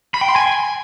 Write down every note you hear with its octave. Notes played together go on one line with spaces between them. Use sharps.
B5
G5
C6
G#5